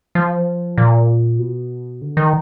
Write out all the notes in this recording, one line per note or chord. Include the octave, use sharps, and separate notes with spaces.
F3
A#2
B2
D3
D#3